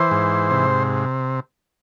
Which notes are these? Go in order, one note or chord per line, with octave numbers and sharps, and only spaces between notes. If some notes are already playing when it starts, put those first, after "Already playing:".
Already playing: E3 C5
G#2
C3